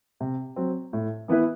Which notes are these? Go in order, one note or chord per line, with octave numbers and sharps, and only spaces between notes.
C3
F#3 C4
A2
E3 B3 E4 B4